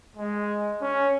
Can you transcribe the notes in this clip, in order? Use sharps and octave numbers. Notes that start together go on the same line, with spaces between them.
G#3
C#4